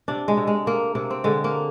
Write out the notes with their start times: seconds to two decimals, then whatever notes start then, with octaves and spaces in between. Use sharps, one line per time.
0.08 C3 D4
0.28 G#3
0.37 C3
0.47 G#3
0.66 C3 A#3
0.95 C3 A#3
1.10 C4
1.24 D3 G#3
1.44 A#3